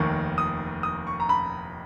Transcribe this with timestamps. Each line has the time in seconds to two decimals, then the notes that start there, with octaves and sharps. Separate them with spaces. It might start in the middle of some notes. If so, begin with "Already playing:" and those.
Already playing: F1 D#2 D#3 A#3 C#6
0.38 D#6
0.83 D#6
1.07 C#6
1.20 A#5
1.29 B5